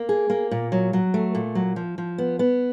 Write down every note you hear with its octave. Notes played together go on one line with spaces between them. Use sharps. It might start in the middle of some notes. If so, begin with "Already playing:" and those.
Already playing: A#3
G#4
A#3
A#2
F#3
F#3
A3
A#2
F#3
F3
F3
B3
B3